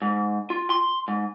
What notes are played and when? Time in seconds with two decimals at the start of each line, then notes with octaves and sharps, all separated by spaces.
0.02 G#2
0.50 F4
0.70 C6
1.08 G#2